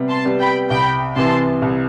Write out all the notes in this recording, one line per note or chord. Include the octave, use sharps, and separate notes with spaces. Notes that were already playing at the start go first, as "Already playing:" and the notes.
Already playing: C3 G3 B3
A5 C6
G3 B3
G5 B5
C2 G5 B5
C3 E3 A5 C6
C2